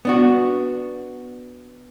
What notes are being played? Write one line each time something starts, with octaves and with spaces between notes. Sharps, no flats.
B3 D4 F#4